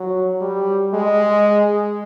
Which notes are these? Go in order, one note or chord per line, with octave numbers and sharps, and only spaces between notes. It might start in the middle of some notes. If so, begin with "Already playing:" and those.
Already playing: F#3
G3
G#3